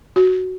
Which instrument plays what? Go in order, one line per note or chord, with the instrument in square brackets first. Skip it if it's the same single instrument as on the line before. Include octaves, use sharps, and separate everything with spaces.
[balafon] F#4